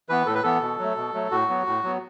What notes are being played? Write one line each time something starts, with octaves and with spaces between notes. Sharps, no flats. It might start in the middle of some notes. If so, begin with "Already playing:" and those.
E3 B3 B4
A2 A4
B4
E3 B3 A4
B2
F#3 A3
B2
F#3 A3
A2 F#4
F#3 B3
A2
F#3 B3